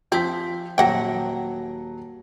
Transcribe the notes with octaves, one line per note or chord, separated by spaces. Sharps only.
F3 C4 B6
D#1 F#3 C5 F#5 G5 A#6